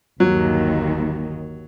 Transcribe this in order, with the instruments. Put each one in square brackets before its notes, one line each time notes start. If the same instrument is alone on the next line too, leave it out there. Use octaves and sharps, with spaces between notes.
[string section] G1 D#2 D#3 [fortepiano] F#3